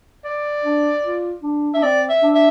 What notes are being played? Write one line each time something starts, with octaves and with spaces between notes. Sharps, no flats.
D5
D4
F4
D4
D4 E5
C4 D5
E5
D4
E5